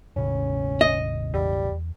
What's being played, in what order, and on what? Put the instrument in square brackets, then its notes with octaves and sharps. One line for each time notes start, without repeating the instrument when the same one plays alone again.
[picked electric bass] E1 A1 C#3 [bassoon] C#4
[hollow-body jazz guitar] D#5
[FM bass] E2 [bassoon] G3